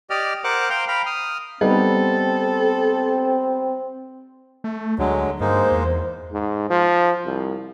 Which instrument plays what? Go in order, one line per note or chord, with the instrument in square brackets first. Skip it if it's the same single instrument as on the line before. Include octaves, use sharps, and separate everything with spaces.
[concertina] G4 D5 D#5 F6
A#4 C5 F#5 D6 F#6
C5 F5 G5 A#5 C6
F5 G5 A#5 B5
D#6 F6
[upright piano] G3 B3 D#4 [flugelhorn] C4 [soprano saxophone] A4
[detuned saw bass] A3
[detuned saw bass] D2 [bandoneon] D3 F#3 G#3
[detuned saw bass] G2 [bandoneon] G#3 A#3 D#4 [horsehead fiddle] C5
[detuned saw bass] E2
[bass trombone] G#2
F3
C2